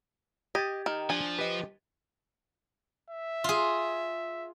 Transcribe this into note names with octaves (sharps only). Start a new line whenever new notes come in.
G4 D#5 G#6 A6
D#3 F6
F3 D4 G#5
G4 B4 D#5
E5
F4 G#4